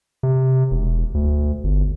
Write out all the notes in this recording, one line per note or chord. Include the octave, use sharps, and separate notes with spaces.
C3
E1
D2
G1